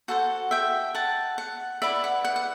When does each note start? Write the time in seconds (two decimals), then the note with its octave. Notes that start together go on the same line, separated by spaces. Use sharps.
0.08 F#4 A4 C5 F#5
0.51 E5 G5
0.95 F#5 A5
1.38 F#5
1.82 E4 B4 D5 E5
2.04 F#5
2.24 F#5
2.36 F#5